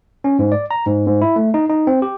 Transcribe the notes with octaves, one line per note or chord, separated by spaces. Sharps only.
C#4
G#2
D5
A#5
G#2
G#2
E4
A3
D#4
D#4
C4
G4